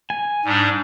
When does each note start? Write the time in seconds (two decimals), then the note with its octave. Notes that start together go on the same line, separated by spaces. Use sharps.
0.10 G#5
0.45 G#2 G3 D4